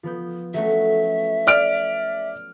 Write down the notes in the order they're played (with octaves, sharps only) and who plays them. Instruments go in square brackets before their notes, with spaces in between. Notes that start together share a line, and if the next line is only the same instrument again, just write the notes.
[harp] F3 B3 G6
[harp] F#3 A3 C#4 [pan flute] E5
[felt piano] D5 F6 D7